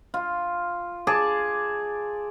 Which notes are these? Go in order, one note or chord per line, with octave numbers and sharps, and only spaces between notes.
F4
G#4 D5 A5